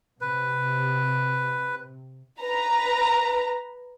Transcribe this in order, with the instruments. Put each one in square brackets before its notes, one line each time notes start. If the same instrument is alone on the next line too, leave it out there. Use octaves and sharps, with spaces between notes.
[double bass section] C3 [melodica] B4
[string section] B4 A#5